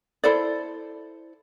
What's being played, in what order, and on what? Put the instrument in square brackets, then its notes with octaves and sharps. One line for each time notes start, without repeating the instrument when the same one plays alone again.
[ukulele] E4 A4 C5 D5